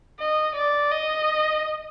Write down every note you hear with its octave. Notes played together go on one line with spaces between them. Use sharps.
D#5
D5
D#5